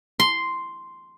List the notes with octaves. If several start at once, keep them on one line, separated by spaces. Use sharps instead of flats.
C6